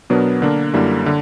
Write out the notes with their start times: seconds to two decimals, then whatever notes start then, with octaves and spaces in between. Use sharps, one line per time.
0.10 B2 F#3 B3 D4 A#4
0.42 D3 A#3 D4 A#4
0.74 F#2 D3 G3 A#3 E4
1.06 D3